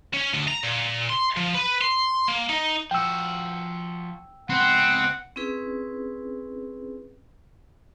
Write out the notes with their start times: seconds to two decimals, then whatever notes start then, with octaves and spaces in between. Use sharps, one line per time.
0.14 C#4
0.34 D2
0.48 A#5
0.64 A#2
1.09 C6
1.37 F3
1.54 B4
1.81 C6
2.28 A#3
2.49 D#4
2.91 F3 F#4 G5 E6
4.50 C#2 B3 C4 F#5
5.36 C4 C#4 E4 G#4 B4